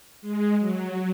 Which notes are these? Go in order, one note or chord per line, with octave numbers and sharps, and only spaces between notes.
G#3
F#3